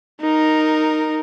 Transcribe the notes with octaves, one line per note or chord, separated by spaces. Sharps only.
D#4 A#4